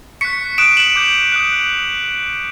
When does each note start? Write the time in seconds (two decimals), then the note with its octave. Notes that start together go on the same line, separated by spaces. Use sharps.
0.21 C#6 F#6 B6 C#7
0.58 D#6 F#6 D7 E7
0.77 E7 F#7
0.96 D6 G6
1.32 D#6 F#6